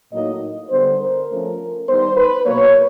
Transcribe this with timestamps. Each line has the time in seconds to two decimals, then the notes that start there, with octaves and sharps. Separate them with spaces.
0.11 A2 F#3 A#3 D#4 D#5
0.69 D3 G3 B3 D4 C5
1.00 A#4
1.29 F3 A3 C#4
1.88 D#3 G3 B3 D#4 C5
2.16 B4
2.46 B2 F#3 A#3 C#5